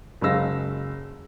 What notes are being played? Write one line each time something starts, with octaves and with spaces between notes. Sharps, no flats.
F#1 F#3 G#3 F5 E6 A#6